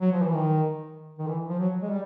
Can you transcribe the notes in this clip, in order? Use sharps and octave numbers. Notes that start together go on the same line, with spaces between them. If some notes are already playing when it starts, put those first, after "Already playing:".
F#3
F3
E3
D#3
D#3
E3
F3
F#3
G#3
G3